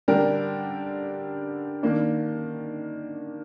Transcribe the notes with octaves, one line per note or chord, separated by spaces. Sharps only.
D3 G3 D4 G4 A#4
D#3 A#3 D4